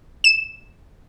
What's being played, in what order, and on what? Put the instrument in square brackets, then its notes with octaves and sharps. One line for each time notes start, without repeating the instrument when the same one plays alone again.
[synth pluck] E7